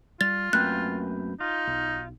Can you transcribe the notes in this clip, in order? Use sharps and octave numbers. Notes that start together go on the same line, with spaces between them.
G3 F4 A6
F#2 A3 A#3 C4 B4 G5 F#6
D#4 F4
B1